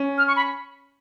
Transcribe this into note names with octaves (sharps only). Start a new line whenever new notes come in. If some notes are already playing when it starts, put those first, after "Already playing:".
Already playing: C#4
F6
C#6
B5